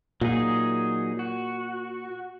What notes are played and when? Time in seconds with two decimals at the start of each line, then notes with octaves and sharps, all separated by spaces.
0.21 A#2 F#3 D#4 G#4
1.19 F#4